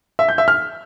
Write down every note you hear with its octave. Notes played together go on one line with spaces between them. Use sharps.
E5
G6
E5
F6